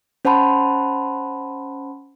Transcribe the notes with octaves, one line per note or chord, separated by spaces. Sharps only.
C#4 C5 F#5 A5 B5 C6